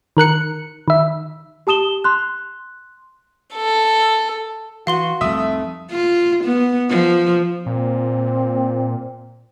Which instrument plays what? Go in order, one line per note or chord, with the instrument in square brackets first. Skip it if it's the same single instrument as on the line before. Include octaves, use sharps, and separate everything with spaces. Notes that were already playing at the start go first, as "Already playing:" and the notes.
[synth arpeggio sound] D#3 A#4 F#6 C#7
D#3 E5
[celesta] G4 A5 D#6 E7 G7
C6 F#6
[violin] A4
[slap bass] E3 [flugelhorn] F#4 [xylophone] F5 C6 G7
[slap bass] F1 C2 [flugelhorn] A3 [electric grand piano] E5 D#6
[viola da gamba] F4
B3
F3
[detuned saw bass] A#2 [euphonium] C4